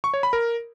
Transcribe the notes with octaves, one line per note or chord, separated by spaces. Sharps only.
C#6
C#5
B5
A#4